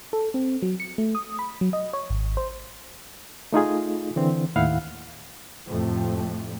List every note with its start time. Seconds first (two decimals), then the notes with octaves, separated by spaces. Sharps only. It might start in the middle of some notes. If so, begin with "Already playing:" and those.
0.13 A4
0.34 C4
0.63 F#3
0.80 C#7
0.98 A3
1.15 D#6
1.39 B5
1.61 F#3
1.73 D#5
1.93 C#5
2.10 G#1
2.37 C5
3.53 A3 D#4 F4 G#4
4.16 D3 E3 C4
4.56 D#2 A2 E4 F5 F#5
5.67 F2 A2 C3 F3 A3